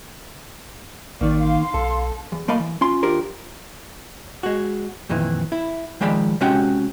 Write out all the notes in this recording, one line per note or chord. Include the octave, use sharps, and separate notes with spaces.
A1 D#3 A#3 D5
F5 C6
B1 A4
E2
B1 A3 A#3 D#5 F5 B5
E3
C#4 F4 C6
D#2 D4 F4 G4 A#4 C5
G#3 F#4
F2 A#2 D#3 E3
E4
D#3 F3 G#3 D5 B5
C3 G#3 C#4 F#4 F#5 G5